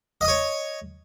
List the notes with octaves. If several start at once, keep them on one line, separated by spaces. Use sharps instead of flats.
C#5 D#5 D#6